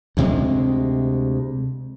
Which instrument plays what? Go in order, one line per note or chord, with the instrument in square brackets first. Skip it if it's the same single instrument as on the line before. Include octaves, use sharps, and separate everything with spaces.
[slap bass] D2 C3 G#3